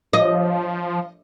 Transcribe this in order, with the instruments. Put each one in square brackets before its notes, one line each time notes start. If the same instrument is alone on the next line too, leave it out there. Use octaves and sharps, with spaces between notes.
[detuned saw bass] F3 [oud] D#5